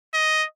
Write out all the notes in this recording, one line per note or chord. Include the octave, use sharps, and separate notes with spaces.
D#5